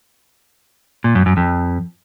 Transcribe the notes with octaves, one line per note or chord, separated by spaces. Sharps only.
A#2
F#2
F#2
F2